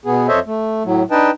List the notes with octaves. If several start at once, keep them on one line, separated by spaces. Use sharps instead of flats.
B2 B3 G#4
F2 A4 C5 C#5 D#5 E5
A3
A2 F#3
D4 D#4 B4 D#5 G5 A5